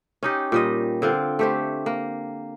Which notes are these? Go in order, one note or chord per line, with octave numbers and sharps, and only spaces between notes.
C#4 D#4 G4
A#2 G3 D#5
D3 C4 F4
A3 G4 C5
A#3